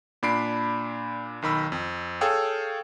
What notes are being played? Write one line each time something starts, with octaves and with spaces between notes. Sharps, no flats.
A#2 D4 B5 C7 D7
B1 D#3 B5 E6
F2
G#4 A4 C#5 F5 G5 E6